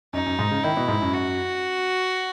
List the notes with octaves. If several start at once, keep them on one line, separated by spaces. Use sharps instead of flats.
F#2 D#4
F#2
G#2
C#3
D#3 E4
B2
G#2
F#2
F#4